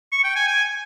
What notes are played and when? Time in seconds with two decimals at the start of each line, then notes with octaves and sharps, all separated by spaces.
0.12 C#6
0.24 G5
0.35 G#5
0.47 G#5